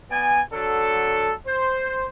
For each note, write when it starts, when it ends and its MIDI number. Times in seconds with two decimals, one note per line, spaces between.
0.10 0.41 59
0.10 0.41 74
0.10 0.41 80
0.52 1.31 50
0.52 1.31 54
0.52 1.31 69
1.46 2.06 72